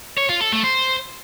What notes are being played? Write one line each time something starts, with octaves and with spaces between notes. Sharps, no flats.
C#5
F4
A4
A3
C5